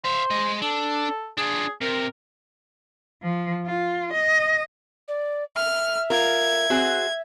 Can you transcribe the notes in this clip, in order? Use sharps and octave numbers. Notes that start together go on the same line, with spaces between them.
C5 E5 F5
G#3 D#5
D4 A4
D4 F4 G#4
C3 A#4
F3
F4
D#5
D5
E5 F6
F4 A#4 G#6
C4 F#4 G#4